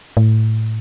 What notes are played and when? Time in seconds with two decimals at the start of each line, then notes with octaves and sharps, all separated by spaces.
0.17 A2